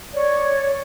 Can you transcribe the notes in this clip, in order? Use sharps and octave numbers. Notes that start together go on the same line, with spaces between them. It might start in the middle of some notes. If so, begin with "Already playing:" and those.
C#5 D5